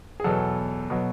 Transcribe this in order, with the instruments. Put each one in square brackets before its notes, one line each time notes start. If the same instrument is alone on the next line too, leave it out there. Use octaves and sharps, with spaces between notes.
[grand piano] G#4
E2 B2 F#3 A4
B2 F#3